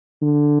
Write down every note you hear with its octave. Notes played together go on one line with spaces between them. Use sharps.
D3